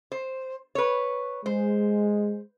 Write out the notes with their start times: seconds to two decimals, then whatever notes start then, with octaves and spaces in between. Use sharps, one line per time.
0.12 C5
0.75 B4 C#5
1.46 G#3 C5